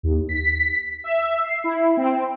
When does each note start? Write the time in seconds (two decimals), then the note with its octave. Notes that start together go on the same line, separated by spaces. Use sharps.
0.03 D#2
0.29 B6
1.04 E5
1.43 C7
1.64 E4
1.97 C4